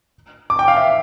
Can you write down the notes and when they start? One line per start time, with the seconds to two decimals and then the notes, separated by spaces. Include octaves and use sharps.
0.50 D6
0.59 G5
0.68 F5
0.77 E5